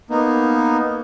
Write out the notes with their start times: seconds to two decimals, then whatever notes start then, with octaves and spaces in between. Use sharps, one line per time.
0.10 A#3 B3 D#4